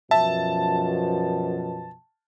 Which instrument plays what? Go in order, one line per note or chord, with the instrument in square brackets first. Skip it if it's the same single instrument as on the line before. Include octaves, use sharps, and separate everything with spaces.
[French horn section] F#2 B2 F3 [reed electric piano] E5 [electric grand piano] A5